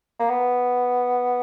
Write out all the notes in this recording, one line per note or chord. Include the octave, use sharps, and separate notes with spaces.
A#3
B3